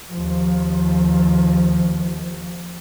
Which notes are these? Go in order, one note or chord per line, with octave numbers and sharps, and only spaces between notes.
D#2 F3